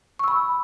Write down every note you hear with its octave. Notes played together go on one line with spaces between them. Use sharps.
B5 C#6 E6